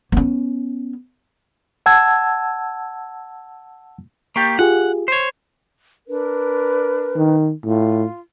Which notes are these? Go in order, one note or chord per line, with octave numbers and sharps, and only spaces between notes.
B3 C#4
F#5 A5 E6 G#6
A#3 G4 C#6 G6 A6
F4 G4 G#4 F#5
C5 C#5
D4 A#4 B4
D#3
A2 F4